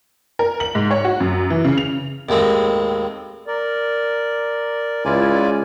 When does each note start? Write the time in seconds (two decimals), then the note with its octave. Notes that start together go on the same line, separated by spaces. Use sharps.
0.39 A#4
0.60 F#7
0.75 G#2
0.91 C#5
1.05 F#4
1.20 F#2
1.50 E3
1.64 C#3
1.78 F7
2.29 D#2 A2 G#3 C4
3.47 A#4 D5
5.05 C#2 E4 F4 D5 G#5